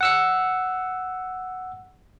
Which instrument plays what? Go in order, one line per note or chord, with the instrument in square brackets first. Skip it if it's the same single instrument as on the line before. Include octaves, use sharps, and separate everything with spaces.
[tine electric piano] F#5 E6 C#7